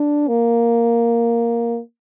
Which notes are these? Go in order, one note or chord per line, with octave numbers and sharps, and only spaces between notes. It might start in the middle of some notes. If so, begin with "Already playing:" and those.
Already playing: D4
A#3